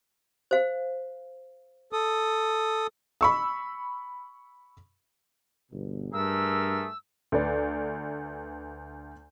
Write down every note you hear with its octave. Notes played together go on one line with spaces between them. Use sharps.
C5 F5
A4 D#6
B5 C#6 E6
G1 B2
G2 A3 G#4 A#4 E6
D2 B4 D5